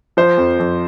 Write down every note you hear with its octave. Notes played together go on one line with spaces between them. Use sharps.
F3 C5
F2
F2